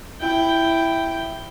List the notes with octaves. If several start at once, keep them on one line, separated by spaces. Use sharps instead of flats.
E4 G5